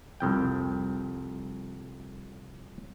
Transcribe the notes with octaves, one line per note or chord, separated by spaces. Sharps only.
C2 F2 G5